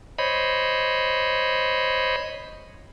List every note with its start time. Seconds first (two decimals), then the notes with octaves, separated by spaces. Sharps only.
0.19 C5 C#5 D#5 B5